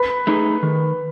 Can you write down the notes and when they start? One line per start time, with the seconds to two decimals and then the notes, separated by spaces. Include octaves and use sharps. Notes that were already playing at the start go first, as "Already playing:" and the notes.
Already playing: B4 B5
0.27 A3 D#4 G#4
0.63 D#3